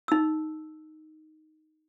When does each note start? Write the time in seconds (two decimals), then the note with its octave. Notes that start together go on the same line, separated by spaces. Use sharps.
0.08 D#4 E6